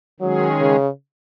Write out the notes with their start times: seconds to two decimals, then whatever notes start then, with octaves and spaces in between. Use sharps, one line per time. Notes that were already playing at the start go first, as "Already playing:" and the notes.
0.20 D#3 F#3 G#3 C#4 G#4
0.60 C#3